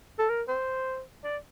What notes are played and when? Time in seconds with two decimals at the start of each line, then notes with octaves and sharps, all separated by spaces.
0.19 A4
0.29 A#4
0.48 C5
1.24 D5